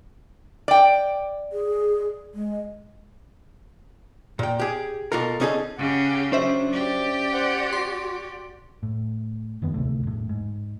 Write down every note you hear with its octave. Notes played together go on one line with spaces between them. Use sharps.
D5 G5
G#4
G#3
A#2 G5
G4 G#4
B2 A#3 F4 A4 A#4
D3 C#4 D#4 F#4 G#4 A4
C#3 C#4 G4 F#5
F#3 C#4 D4 C5 E5
G4 D5
C5 F#5
F#4 C6
A2
D#1 F2 D#3 B3
A1 D2 C3 A3
E1 A2
G#2